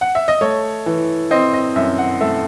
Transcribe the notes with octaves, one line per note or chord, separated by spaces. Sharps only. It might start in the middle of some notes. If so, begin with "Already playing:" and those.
F#5
E5
D#5
A3 C#5
E3
C4 D#5
D#5
F#2 E5
F#5
A3 E5